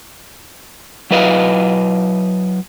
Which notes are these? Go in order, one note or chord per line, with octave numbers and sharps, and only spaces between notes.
F#3 E4 B4 D#5 F5